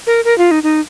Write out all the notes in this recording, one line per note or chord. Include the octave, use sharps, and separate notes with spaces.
A#4
A#4
F4
D#4
D#4